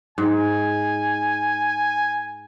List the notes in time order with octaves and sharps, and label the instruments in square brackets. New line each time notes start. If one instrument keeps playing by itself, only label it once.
[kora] G#2 [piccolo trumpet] G#5